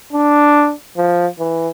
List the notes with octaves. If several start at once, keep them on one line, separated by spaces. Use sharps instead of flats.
D4
F3
E3